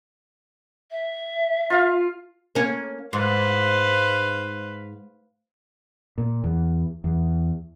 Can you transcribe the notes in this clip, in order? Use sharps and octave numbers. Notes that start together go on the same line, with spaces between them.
E5
F4 F5
A#3 C#4
G#2 B4 C5 F5
A#2
E2
E2